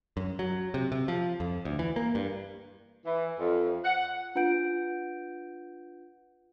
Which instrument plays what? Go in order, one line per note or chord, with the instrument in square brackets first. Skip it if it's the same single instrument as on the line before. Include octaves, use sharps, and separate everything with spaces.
[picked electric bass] F#2
F#3
C3
C3
F3
F2
D2
E3
A#3
G2
[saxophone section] E3
F2
F#5
[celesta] D4 F4 B4 F#5 G6 D7